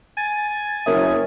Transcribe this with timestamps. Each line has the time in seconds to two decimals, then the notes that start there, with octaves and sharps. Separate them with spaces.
0.17 G#5 A6
0.86 F#1 A#4 C#5 E5 D#6